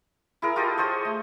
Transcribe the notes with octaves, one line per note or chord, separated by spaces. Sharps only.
E4 G#4 A#4
F4 G4 A4 D#5
G#4 C5 C#5 D#5
A3